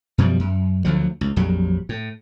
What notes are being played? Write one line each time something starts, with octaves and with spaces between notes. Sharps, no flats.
F#2 B2 F3 G3
F#2
D2 D3 F3 F#3
C#2
A#1 F2 F#3 G3
A2